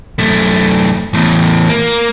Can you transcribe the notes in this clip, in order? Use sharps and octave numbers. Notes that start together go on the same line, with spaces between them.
F#2 A3
E2 A2
A#3